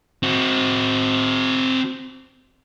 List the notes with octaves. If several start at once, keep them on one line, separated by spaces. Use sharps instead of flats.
C4 F#4